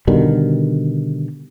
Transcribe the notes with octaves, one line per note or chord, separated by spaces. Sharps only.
B2 D3 D#3 G3